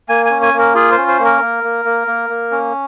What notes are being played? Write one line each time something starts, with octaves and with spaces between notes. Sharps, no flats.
A#3 G#5
G#5
C#4
G#5
A#3
A#4
F4 G#4
C5
C#4
C5
A#3
A#4
A#3
A#3
A#3
A#3
A#3
C#4